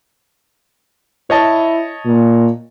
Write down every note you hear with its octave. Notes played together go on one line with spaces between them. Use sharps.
E4 C#5 D#5 A5
A#2